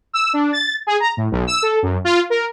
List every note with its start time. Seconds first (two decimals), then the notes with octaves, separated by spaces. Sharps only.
0.13 E6
0.33 D4
0.53 A6
0.87 G#4
1.00 A#5
1.17 A2
1.32 B1
1.47 E6
1.62 A4
1.83 F#2
2.05 F4
2.30 A#4